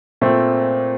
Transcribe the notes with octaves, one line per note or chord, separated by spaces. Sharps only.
A#2 A3 C4